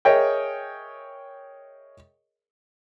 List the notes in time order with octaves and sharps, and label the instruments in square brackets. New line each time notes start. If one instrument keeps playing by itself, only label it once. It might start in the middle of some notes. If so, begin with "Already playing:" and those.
[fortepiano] G#4 A#4 C#5 D#5 E5 G5